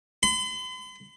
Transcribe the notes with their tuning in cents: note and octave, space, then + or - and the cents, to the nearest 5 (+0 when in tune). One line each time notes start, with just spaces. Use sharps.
C6 -45